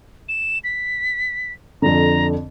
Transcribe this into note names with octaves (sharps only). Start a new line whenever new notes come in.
E7
B6
F2 D3 A#5